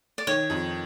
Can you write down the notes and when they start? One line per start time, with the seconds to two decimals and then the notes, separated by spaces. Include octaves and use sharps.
0.18 D5
0.27 D#3 C#5
0.50 F2